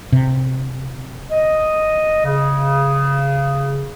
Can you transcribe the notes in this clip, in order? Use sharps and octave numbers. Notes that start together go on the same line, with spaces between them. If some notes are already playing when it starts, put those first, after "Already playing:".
C3
D#5
C#3